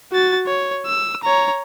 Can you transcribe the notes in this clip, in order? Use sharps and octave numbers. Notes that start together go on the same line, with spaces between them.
F#4 A6
C#5
E6
C#5 A#5